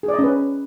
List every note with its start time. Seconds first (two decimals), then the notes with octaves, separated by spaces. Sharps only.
0.03 G#4
0.08 D5
0.14 D#5
0.19 C#4
0.24 B4